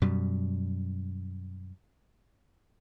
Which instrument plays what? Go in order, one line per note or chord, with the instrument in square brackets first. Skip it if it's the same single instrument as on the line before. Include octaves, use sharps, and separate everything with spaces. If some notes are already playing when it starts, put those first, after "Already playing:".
[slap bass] F#2 B2 G3